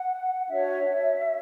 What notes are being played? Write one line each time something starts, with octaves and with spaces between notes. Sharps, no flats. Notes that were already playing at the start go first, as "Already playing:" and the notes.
Already playing: F#5
D4 F#4 C#5 E5